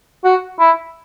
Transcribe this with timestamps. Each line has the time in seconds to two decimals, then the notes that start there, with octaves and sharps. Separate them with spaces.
0.24 F#4
0.60 E4